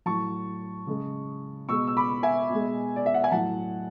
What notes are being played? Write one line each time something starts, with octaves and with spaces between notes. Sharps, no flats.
A2 F#3 A5 C#6
C#3 G#3
B2 G#3 C#6 E6
E6
B5 D6
E5 G#5
B2 G#3
D5
E5
F#5
G#5
A2 F#3 F#5 A5